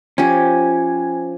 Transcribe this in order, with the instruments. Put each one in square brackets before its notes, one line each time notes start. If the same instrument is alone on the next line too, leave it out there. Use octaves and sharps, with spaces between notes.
[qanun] F3 G4 [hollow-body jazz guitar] C#4 [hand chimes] C5 G#5 G#6